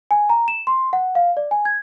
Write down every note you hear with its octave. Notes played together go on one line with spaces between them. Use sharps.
G#5
A#5
E7
C6
F#5
F5
D5
G#5
G#6